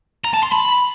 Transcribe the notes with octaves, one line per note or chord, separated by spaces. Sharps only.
A#5
A5
C6
B5